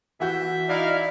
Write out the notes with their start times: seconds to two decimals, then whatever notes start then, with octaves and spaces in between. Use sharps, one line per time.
0.20 E3 F#4 E5 G6
0.69 D#4 E4 D5 F5